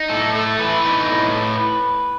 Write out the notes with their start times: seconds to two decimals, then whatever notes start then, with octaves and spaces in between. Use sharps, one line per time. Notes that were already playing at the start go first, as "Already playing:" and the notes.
Already playing: D#4
0.09 A2 A4
0.34 A3 A4
0.59 E3 B4
0.85 D#4
1.10 A2